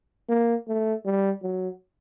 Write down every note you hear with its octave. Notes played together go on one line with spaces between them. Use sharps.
A#3
A3
G3
F#3